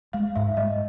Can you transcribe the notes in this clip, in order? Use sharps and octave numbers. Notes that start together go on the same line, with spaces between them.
G#3 F5
G#2 E5
G#3 D#5